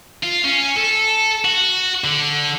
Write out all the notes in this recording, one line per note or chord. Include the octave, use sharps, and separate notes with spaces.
F4
C#4
A4
F#4
D3